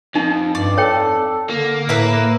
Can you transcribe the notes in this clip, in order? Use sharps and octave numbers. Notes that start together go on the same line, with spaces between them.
F2 D#4
G2 D5
A4 C#5 G5
D3 A#3
A2 A#4 B4 E5